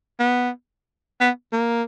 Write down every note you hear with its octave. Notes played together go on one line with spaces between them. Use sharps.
B3
B3
A#3